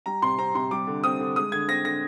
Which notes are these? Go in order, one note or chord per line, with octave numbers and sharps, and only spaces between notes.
G3 A#5
C3 C6
C4 A#5
C3 C6
G3 D6
D3
C4 D#6
D3
G#3 D#6
D3 G#6
C4 A#6
D3 A#6